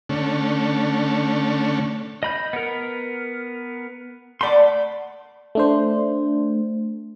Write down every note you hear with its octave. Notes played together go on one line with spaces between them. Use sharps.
D3 A3 C#4
D#5 B5 G6
B3 A#4
A3 A#3 D5 F#5 B5 C6
A3 D4 C5